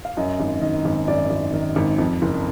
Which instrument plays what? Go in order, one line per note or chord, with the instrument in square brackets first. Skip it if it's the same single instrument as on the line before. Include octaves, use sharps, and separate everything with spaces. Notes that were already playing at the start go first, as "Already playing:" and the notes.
[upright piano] F5
F#2 D#5
G#1
D#3 D#5
G#1
F#2 D5
G#1
D#3
G#1
F2
F#1